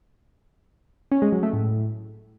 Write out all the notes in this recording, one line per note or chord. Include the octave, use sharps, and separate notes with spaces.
C#4
G#3
F#3
A3
A2